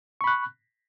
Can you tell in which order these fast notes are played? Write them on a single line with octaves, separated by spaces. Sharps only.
C#6 B5 F#6